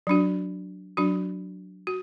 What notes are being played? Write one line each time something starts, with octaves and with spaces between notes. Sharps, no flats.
F#3 D4 F#4
F#3 D4 F#4
F#4